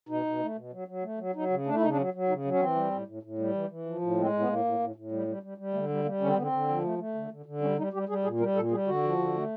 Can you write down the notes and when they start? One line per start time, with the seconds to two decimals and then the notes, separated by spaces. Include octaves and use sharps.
0.09 B2 D#4
0.25 B2
0.41 A3
0.56 B2
0.73 F#3
0.88 F#3
1.03 A3
1.19 F#3
1.35 F#3 D#4
1.50 C#3
1.66 A3 D4
1.75 E4
1.81 C#3 D#4
1.89 D4
1.97 F#3 C#4
2.14 F#3
2.28 C#3 D#4
2.45 F#3
2.50 C#4
2.60 E3 C4
2.75 G3
2.91 A2
3.07 A2
3.23 A2
3.39 G3
3.55 E3
3.69 E3
3.86 F3
4.01 A2
4.17 G#3 C4
4.33 A2
4.39 B3
4.48 A2 A#3
4.64 A2
4.79 A2
4.96 A2
5.11 G3
5.27 G3
5.43 G3
5.58 G3
5.74 D3 A3
5.89 G3
6.04 G3 A#3
6.20 D3 C#4
6.28 C4
6.35 D3 B3
6.42 C4
6.52 D3
6.68 F3
6.84 A3
6.98 A3
7.14 D3
7.31 D3
7.46 D3
7.61 G3 C#4
7.78 G3 D#4
7.93 G3 G4
8.09 G3 G#4
8.24 A#2 G#4
8.39 G3 A#4
8.55 A#2 A4
8.71 G3 G#4
8.87 D3 F#4
9.03 F3
9.18 D3
9.34 A3